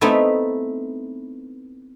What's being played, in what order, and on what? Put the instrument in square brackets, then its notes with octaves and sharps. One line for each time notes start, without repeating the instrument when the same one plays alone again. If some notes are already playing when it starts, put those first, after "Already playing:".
[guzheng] A3 B3 C4 D#4 E4